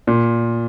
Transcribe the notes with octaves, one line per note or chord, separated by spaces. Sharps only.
A#2